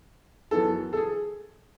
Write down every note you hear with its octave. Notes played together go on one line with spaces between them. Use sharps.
F#2 E3 B3 A4
A4
G#4